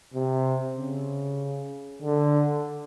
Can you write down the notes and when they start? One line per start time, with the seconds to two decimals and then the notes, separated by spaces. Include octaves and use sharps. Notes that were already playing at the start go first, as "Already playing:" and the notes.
0.14 C3
0.77 C#3
2.02 D3